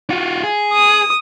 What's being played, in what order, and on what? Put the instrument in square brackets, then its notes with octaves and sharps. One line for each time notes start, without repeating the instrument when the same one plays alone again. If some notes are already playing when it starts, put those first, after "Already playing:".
[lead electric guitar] F4 F#4
G#4
[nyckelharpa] D#6